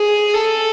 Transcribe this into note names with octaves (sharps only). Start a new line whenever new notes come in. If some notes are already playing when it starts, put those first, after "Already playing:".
Already playing: G#4
A4